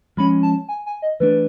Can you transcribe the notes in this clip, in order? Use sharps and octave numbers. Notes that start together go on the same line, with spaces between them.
F3 G#3 C#4 B5
A5
G#5
G#5
D#5
E3 A3 D4 B4